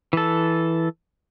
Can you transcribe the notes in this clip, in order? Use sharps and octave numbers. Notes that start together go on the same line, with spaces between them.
E3 A4